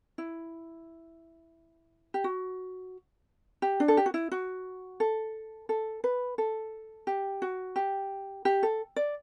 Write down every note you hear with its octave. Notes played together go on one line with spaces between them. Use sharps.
E4
G4
F#4
G4
D4
A4
G4
F#4
E4
F#4
A4
A4
B4
A4
G4
F#4
G4
G4
A4
D5